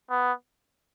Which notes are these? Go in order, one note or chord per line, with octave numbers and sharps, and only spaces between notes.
B3